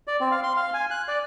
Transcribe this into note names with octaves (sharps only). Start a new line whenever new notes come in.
D5
C4
F5
C6
F5
G#5
F#6
D5